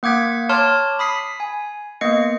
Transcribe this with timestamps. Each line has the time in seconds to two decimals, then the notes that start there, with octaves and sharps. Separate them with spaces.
0.03 A#3 F#5 D6 G#6 B6
0.49 C#5 A5 C6 D6 F6
0.99 B5 D#6 B6 C7
1.40 G#5
2.01 A#3 B3 D#5 C7 C#7